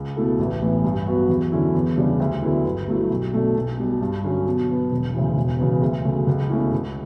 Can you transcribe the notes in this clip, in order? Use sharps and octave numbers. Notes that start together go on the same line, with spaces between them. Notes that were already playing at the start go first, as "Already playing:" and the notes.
Already playing: C#2
B2 A3 E4 A4
A1
A2 E3 B3
G2
F#3 B3 F#4
E2
D3 F#3 C#4 E4
E2
C#3 G3 D4
D2
D3 F#3 B3 E4
G1
G2 F#3 A3 E4
B1
B2 A3 D4 A4
B1
B2 G3
G2
D3 F#3 C#4
B2
F#3 B3
E1
D2 C#3 E3
E1
E2 C#3 F#3 B3
D2
C#3 F#3 A3
C#2
B2 A3 C#4 E4
C#2